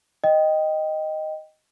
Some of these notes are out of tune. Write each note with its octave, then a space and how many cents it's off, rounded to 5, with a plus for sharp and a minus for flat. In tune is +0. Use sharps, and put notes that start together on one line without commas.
D#5 +0 G5 +0